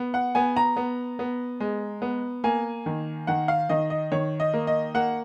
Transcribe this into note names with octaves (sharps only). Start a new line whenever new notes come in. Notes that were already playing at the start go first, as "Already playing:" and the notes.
Already playing: B3
F#5
B3 G#5
A#5
B3
B3
G#3
B3
A#3 G#5
D#3
D#3 F#5
F5
D#3 D#5
D#5
D#3 C#5
D#5
A#3
D#5
A#3 F#5